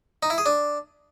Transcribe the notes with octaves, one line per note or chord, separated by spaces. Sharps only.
D#4
E4
G#4
D4